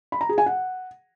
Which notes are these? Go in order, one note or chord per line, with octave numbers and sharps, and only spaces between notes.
B5
A#5
G#4
G#5
F#5